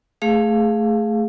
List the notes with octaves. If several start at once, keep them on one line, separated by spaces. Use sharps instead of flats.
A3 G#4 F5